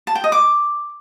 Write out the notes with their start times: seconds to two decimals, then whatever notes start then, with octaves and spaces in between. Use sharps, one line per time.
0.07 A5
0.15 G5
0.24 D#5
0.32 D6